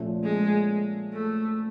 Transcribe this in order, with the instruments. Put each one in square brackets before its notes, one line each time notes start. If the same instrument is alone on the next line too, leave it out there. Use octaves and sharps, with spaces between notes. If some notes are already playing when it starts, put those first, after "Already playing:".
Already playing: [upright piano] A#2 F3 A3 C#4
[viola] G#3
A3